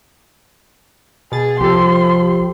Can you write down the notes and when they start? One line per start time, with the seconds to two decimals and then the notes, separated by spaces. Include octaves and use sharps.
1.32 B2 G#4 A6
1.61 C2 F3 G4 A4 C6